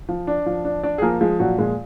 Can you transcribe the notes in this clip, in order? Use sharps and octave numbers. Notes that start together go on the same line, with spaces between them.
F3
D4
F3
D4
D4 D5
G#4
F3 A#3 A#4
F3 G#3 G#4
A#2 F#3 F#4
A#2 G#3 G#4